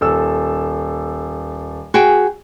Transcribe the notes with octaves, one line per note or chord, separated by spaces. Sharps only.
D#1 A4 E6
F#4 G#4 G5